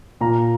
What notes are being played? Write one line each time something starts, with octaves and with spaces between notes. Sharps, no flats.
A#2 A#5